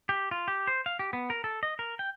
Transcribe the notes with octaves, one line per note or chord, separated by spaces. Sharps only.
G4
F4
G4
C5
F5
G4
B3
A#4
A4
D#5
A#4
G5